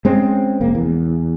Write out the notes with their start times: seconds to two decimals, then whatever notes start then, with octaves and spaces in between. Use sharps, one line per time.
0.05 G#3 C4 C#4
0.61 F1 A#3
0.75 E2